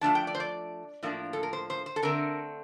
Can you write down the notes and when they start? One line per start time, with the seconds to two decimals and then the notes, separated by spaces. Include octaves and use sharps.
0.01 F3 A3 D4 A5
0.15 G5
0.27 D5
0.35 C5
0.40 D5
1.03 A2 F3 A#3 D4
1.33 A4
1.43 A#4
1.53 C5
1.70 C5
1.86 C5
1.96 A4
2.02 D3 A3 C4 A#4